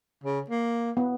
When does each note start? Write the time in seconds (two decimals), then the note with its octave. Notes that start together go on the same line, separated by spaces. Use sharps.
0.24 C#3
0.50 A#3
0.97 B3